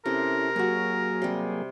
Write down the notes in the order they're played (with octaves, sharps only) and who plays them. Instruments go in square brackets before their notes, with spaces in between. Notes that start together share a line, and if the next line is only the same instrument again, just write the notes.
[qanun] C3 [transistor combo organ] C#4 E4 A4 [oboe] A#4
[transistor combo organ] F#3 A#3 G#4 [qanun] F#4 C#5
[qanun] C3 G3